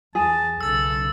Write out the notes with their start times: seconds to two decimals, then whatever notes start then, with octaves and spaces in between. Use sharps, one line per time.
0.15 E2 G#4 A5
0.61 B1 C#3 A4 E6 A6